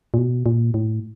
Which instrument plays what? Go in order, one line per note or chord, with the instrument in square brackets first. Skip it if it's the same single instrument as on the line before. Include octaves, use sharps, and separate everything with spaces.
[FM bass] A#2
B2
A#2
A2